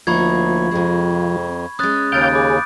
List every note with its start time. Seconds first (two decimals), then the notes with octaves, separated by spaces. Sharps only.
0.07 D2 F3 A#3 D#4 C#5 B5 C#6 G#6
0.71 F2 C3 G#3
1.79 G#3 C#4 D#6 F#6 A6
2.12 D#2 C#3 F5 G5 D6 G6 A6 D7
2.35 G#4 B5 D6